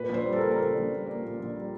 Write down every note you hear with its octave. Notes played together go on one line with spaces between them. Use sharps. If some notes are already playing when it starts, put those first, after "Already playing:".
Already playing: A#2 B4
A#1 C5
G3
A4
A#4
A#3
A#4
A#2 A4
A#1
G3
A#3
A#2
A#1
G3